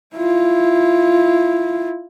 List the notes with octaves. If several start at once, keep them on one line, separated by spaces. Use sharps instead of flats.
E4 F4